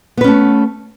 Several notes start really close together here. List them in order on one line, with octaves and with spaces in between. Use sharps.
B3 B4 C#4 A3